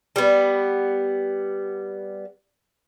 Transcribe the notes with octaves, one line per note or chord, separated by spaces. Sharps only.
G3 B3